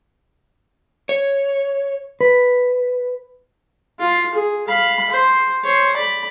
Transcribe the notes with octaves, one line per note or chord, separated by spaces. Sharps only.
C#5
B4
F4
G#4
F5 B5
C5
C5 C#5
D5 B5